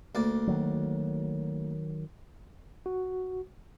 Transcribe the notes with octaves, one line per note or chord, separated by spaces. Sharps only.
D2 A#3 D5
D#3 F#3
F#4